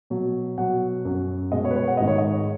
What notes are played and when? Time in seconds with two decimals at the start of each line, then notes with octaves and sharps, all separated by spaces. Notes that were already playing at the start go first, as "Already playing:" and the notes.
0.10 B2 F#3
0.58 B2 F#3 F#5
1.05 F#2 F#3
1.52 B2 G#3 D#5
1.65 C#5
1.71 B4
1.76 C#5
1.88 F#5
1.97 G#2 D#3 G#3 D#5
2.08 C#5
2.18 D#5